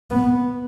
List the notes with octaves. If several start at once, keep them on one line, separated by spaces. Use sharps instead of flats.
B3